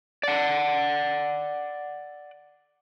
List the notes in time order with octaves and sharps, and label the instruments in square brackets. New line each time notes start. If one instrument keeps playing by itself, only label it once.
[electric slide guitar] D5 F#5